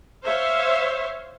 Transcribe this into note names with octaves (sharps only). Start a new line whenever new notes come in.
C5 C#5 E5 F5